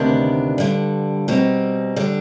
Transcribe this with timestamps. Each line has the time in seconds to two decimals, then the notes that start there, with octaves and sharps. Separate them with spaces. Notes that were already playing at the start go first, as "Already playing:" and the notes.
Already playing: D2 C3 D#3 B3 D4
0.58 G2 D3 G3
1.28 B2 G3 C4 D#4
1.96 D3 G3 D4